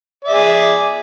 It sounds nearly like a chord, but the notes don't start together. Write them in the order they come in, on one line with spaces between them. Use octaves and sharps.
D5 E5 G#4